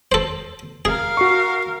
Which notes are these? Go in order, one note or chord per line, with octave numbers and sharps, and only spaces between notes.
A4 C5
G#4 A#4 F5
F#4 C#6 C7